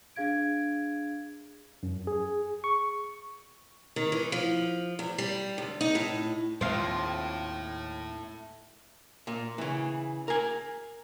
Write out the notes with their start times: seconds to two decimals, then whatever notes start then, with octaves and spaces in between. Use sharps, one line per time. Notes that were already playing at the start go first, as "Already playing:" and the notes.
0.16 D4 G#4 F5 G#6 D7
1.83 F#2
2.07 G#4
2.64 C#6
3.96 D#3
4.12 E3
4.32 F3
4.99 E2
5.18 G3
5.58 D2
5.81 D#4
5.95 A2
6.61 D#2 A2 A3 C4 F4
9.27 A#2
9.58 C#3 E3
10.28 A#4 G#5